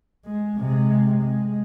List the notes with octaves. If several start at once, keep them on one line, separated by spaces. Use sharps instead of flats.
G#3
C3 G#3
G#3